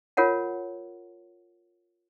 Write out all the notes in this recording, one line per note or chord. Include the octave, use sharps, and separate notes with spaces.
F4 A#4 C#5 F#5 A5